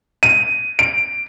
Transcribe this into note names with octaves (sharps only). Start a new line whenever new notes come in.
D#7
D7